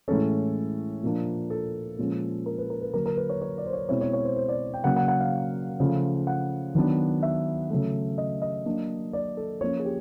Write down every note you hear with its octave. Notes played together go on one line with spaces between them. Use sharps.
A2 E3 G#3 C#4 A4
A#2 F3 A#3 D4
A4
A#2 F3 G#3 C#4
A#4
B4
A#4
B4
D3 F#3 A#3 A#4
A#4
B4
C#5
C#5
D5
C5
C#5
B2 G#3 C4 E4 C#5
C#5
C#5
C5
C5
D5
G5
C#3 F#3 A#3 F#5
F#5
F#5
F5
C#3 F3 A3
F#5
D#3 F#3 B3 D4
E5
C#3 F#3 A3
D#5
D#5
F#3 A#3 D4
D5
A4
F3 A#3 C#4 C#5
G#4
G4